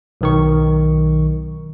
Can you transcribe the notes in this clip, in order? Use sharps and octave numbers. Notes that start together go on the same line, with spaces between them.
B1 D#3 C#6